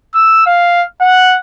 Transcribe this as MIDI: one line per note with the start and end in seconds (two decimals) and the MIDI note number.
0.15 0.46 88
0.47 0.83 77
1.01 1.38 78